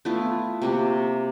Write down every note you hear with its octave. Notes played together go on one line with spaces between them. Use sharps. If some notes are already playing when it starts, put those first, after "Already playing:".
A3 B3 E4 F4
C3 A#3 F#4